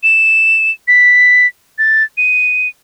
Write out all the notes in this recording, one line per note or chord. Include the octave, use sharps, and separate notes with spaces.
E7
B6
A6
D#7